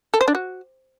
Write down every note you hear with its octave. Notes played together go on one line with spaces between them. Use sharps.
A4
C5
D4
F#4